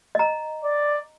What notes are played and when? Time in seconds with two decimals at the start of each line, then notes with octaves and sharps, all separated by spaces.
0.15 D#5 A#5
0.63 D5